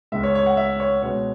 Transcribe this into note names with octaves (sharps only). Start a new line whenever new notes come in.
C#2 C#3 G#3 E5
C#5
C#5
F#5
E5
C#5
B2 G#3 C#4 C#5